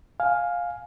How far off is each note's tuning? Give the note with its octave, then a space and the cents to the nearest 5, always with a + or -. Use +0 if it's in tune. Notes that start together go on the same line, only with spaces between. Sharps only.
F5 +10 G#5 +0